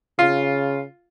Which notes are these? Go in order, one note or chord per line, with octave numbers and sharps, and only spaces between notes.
C#3 F4